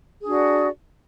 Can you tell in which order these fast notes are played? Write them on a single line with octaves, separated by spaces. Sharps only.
G#4 D4 F#4 D5